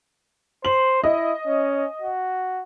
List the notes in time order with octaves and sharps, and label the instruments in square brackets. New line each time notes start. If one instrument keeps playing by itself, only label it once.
[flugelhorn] C5 [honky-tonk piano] F#7
[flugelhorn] E4 [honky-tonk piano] D#5
[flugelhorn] C#4
F#4